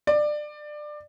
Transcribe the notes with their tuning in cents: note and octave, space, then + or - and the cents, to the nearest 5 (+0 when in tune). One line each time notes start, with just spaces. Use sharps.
D5 +20